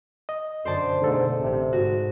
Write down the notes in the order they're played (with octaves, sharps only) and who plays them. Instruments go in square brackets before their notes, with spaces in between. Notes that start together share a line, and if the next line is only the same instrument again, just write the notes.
[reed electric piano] D#5
[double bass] F#2 D3 [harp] C5 D5 A5
[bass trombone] G#2 [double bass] B2 A3 [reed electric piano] D3 A4
[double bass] A1 [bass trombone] C3
[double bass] G#2 [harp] F#4